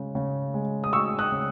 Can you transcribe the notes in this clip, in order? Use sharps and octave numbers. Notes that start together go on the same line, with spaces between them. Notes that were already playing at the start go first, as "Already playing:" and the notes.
Already playing: C#3 G#3
C#3
G#3
D#6
G#3 C#6 E6
D#6 F#6
C#3